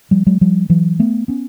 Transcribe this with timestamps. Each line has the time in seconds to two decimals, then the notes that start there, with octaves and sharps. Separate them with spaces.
0.11 F3 G3
0.26 F#3 G#3
0.41 F3 G3
0.70 E3 F#3
1.00 A3 B3
1.28 B3 C#4